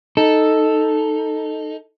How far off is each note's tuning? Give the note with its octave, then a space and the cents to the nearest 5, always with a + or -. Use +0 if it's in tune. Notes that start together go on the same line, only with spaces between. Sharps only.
D#4 +0 A4 +0